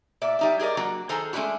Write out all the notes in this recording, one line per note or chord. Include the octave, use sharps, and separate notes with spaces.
A#2 D5 E5
G3 D#4 E5
G4 G#4 A#4 D5 D#5
F#3 A#3 D4 F#4
D#3 G#4 A4 C5 G#5 A#5
G#3 A3 C#4 D4 E4 F#4